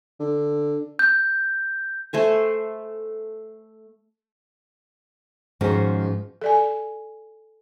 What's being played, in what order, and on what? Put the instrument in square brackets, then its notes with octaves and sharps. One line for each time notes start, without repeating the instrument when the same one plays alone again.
[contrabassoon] D3
[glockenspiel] G6
[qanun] A3 C5 G#5
[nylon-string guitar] G#2 D#3 F3 G#3 C#4 F#4
[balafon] A4 D5 G#5